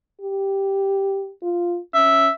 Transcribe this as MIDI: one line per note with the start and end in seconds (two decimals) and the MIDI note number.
0.21 1.30 67
1.42 1.79 65
1.94 2.28 61
1.94 2.30 76